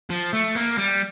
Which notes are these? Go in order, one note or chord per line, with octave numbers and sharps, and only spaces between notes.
F3
A3
A#3
G3